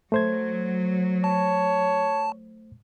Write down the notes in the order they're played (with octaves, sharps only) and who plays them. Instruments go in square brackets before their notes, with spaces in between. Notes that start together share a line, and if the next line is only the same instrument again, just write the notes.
[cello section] F#3 [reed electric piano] A3 C5 G#6
[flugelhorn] C#5 [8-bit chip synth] A5